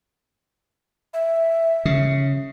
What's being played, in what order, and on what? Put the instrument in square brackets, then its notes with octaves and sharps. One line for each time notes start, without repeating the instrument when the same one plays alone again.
[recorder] E5
[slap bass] C#3